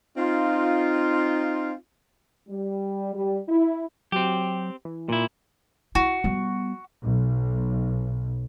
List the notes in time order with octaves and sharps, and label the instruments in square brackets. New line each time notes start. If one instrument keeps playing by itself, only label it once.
[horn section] C4 D#4 F4
[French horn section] G3
G3
E4
[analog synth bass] F#3 [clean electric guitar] C4 G4
[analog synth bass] E3
[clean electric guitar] A#2 E4
[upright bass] E4 [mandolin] F#4
[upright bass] G3 B3
[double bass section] B1